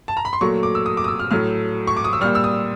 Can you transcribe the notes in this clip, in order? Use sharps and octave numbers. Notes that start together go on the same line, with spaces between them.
A5
A#5
B5
C6
A#2 F#3 A3 C#6
D6
E6
D#6
D6
D#6
E6
F6
A2 F#3 A3 F6
C#6
D6
D#6
E6
A#2 G3 F6
E6
D#6